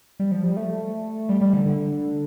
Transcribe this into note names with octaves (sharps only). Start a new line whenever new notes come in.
G3
F3
G3
A3
G3
G3
D3
D3